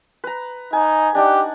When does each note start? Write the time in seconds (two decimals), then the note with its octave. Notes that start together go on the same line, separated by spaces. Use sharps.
0.24 B4 A#5
0.73 D#4 G#5
1.15 D4 D#4 G4 F#5